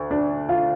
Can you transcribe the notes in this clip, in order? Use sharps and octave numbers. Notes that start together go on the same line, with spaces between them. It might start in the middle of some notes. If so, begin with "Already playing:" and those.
Already playing: D2
D4
F4